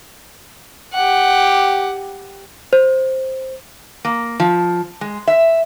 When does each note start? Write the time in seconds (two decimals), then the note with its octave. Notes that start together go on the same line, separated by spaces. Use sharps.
0.94 G4 F#5
2.73 C5
4.05 A#3
4.40 F3
5.01 G#3
5.27 E5